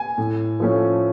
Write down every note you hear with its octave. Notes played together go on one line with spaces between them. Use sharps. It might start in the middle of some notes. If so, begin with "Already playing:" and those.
Already playing: G#5
A2
F3 A3 C#4